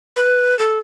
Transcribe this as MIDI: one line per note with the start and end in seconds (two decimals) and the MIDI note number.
0.16 0.57 71
0.59 0.78 69